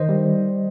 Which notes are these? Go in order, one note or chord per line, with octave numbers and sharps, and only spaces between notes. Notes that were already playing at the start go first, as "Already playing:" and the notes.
Already playing: D#3 C5 D#5
G3